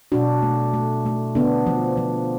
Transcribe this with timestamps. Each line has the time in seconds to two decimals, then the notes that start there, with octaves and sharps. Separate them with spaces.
0.12 B2 D4 F#4
0.43 A3
0.73 A3
1.06 A3
1.35 D3 B3 D4
1.67 F3
1.97 F3